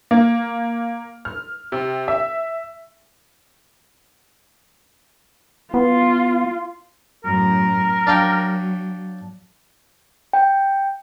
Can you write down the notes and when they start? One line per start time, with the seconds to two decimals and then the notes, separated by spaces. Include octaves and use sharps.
0.11 A#3
1.25 F6
1.72 C3
2.08 E5
5.74 B3 F4
7.24 F#2 A2 A#4
8.07 F#3 D4 F5 G5
10.33 G5